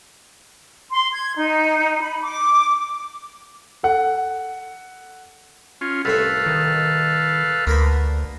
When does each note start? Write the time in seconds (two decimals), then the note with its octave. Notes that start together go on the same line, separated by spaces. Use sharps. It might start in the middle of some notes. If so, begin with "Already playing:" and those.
0.91 C6
1.12 G#6
1.36 D#4
2.01 B5
2.23 D6
3.83 A4 F#5
5.81 C#4 F4
6.05 C2 A2 A4 B4 E5 F5
6.46 D#3
7.67 D2 A#3 A#4 B4